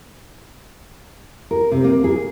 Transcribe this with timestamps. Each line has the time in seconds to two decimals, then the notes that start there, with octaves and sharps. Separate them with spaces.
1.51 A#4
1.71 C3
1.84 A#3
2.04 G#4